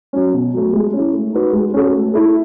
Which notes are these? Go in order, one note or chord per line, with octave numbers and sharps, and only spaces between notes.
F#3 C#4
B2
F#3 A3
G#3
C#4 E4
A3
D#4 F#4 B4
G#3
C#4 F#4 A4
A3
E4 A4